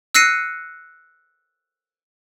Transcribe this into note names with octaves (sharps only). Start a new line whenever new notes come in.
E6 F#6 A#6 C7 C#7 D#7